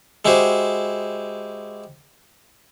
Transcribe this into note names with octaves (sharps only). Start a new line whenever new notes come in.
G#3 E4 F#4 G4 C5